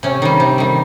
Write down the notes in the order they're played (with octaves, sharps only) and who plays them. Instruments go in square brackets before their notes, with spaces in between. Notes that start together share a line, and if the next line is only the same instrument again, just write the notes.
[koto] C3 C#4
D#3 G3
C3
D#3 G3